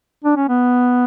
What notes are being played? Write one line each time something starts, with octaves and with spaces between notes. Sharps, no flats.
D4
C#4
B3